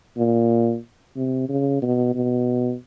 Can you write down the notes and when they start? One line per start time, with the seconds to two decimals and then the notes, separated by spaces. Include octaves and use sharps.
0.17 A#2
1.16 C3
1.49 C#3
1.82 B2
2.15 B2